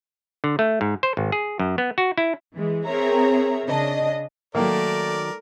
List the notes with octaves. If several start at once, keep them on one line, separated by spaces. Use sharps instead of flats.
D3
A3
G#2
C5
G#1
G#4
F#2
B3
F#4
E4
E3 G#3
C4 G#4 A#4 C#5 E5 A#5
C#3 D4 D#5
D#3 F#3 A3 A#3 A#4 D5